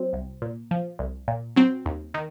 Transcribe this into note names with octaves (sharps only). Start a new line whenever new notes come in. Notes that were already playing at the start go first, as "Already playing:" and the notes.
Already playing: F#3 C4
C2
A#2
F3
C2
A#2
F#3 C4
D#2
D#3